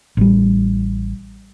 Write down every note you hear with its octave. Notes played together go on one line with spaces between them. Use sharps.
A1 G3